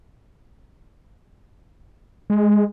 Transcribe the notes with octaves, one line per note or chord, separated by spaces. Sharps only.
G#3